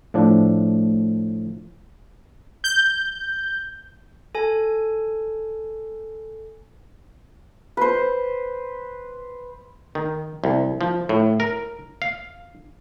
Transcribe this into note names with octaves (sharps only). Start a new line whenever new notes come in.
A2 F3 D4
G6
A4 G#5
B4 C5
D#3
C2
F3
A2
A#4
F5